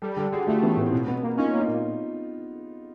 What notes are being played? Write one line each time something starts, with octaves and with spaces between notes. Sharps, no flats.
G3 G4 A4
D3 G4 A4
D3 F#4 G#4
A3 F4 G4
E3 B3 C#4
A2 B3
C4
B2 B3
B2 B3
A#3 B3
C#4 D#4 F4
A#3
D#4 F4
A#2